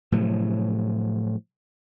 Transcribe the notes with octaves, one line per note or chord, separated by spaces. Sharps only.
A2 C3 F3 F#3